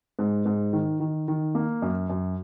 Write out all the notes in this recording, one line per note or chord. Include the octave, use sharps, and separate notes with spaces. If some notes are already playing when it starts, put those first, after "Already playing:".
G#2
G#2
D#3
D#3
D#3
A#3
F#2
F#2